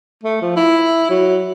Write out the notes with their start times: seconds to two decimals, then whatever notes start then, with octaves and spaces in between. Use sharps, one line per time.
0.23 A3
0.42 F3
0.56 E4
1.10 F#3